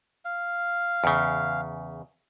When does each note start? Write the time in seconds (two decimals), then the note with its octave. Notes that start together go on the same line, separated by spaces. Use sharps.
0.25 F5
1.04 E2 C#3